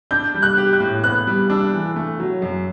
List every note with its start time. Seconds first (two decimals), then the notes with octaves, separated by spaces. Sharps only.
0.11 D4 G6
0.34 G3
0.42 F#6
0.58 G4
0.73 F#6
0.80 A2
1.04 B3 F#6
1.27 G3
1.50 D4 E6
1.73 E3
1.96 A3
2.20 F#3
2.42 F#2